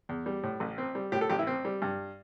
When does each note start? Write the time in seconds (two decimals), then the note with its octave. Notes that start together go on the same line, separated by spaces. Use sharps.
0.09 E2
0.26 G3
0.43 A2
0.60 A1
0.78 C4
0.95 G3
1.12 A2 G4
1.21 A4
1.29 A1 G4
1.39 E4
1.47 C4
1.65 G3
1.82 G2